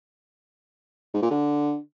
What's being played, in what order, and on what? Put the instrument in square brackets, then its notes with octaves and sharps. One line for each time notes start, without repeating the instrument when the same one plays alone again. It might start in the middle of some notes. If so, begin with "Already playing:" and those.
[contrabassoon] G#2
A#2
D3